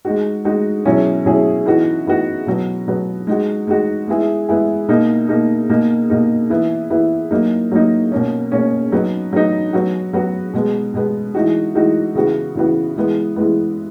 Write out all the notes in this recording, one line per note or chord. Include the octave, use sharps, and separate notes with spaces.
G#3 D#4 F#4
G#3 D#4 F#4
B2 F#3 C#4 E4 G#4
B2 F#3 C#4 E4 G#4
E3 B3 D#4 F#4
E3 B3 D#4 F#4
B2 F#3 B3
B2 F#3 B3
G#3 D#4 F#4
G#3 D#4 F#4
G#3 B3 E4 G#4
G#3 B3 E4 G#4
B2 A#3 D#4
B2 A#3 D#4
B2 A#3 D#4
B2 A#3 D#4
E3 B3 E4
E3 B3 E4
F#3 A#3 D#4
F#3 A#3 D#4
B2 A#3 C#4
B2 A#3 C#4
F#3 B3 D#4
F#3 B3 D#4
F#3 B3 F#4
F#3 B3 F#4
B2 G#3 B3
B2 G#3 B3
E3 G#3 D#4 F#4
E3 G#3 D#4 F#4
C#3 E3 B3 F#4
C#3 E3 B3 F#4
E3 G#3 B3
E3 G#3 B3